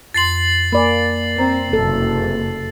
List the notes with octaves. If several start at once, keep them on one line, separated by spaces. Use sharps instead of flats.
F2 C6 A6 C7 F#7
A#3 D5 G#5 B5
C4 A#5
F#1 C3 A4